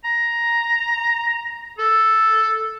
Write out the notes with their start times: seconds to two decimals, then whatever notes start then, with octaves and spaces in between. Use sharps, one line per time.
0.04 A#5
1.78 A4